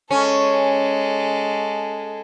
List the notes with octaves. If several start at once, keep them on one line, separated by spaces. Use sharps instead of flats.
G#3 C#4 A4